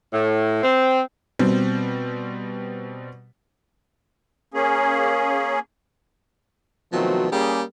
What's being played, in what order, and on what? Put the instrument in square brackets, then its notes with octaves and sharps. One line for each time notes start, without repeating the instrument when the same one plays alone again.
[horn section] A2
C4
[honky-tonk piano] B2 G3 C4
[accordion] A#3 C#4 G#4
[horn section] B2 D#3 F3 F#3 A3 C4
G3 A#3 C#4 G4 G#4